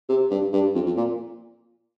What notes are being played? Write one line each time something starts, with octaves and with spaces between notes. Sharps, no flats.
C3
G2
G2
F2
F2
A#2